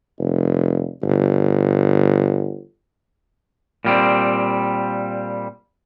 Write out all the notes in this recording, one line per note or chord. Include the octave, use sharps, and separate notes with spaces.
F1
G1
A#2 G3 C4